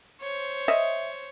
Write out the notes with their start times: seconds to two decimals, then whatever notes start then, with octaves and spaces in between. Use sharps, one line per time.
0.22 C5 C#5
0.68 D#5 E5